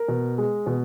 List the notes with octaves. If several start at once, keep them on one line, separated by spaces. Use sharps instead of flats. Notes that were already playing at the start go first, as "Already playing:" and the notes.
Already playing: A#4
B2
G#3
B2